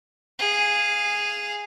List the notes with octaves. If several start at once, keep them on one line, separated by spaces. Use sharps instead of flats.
G#4 F5